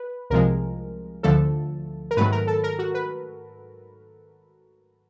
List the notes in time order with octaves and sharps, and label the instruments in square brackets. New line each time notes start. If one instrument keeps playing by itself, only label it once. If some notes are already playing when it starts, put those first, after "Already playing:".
Already playing: [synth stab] B4
C2 C3 F3 G#3 A#4
D2 D3 F3 A3 A4
A#4
G#2 D#3 F#3 A3 B4
A#4
A4
A#4
F#4
B4